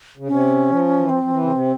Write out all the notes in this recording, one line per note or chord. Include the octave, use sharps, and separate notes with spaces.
C#3
C3 C#4
F3
E3
F3 C4
F3
E3
C#3
C3